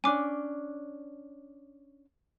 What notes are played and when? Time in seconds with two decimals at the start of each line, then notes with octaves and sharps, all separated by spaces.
0.04 C#4 D4 G#5 D6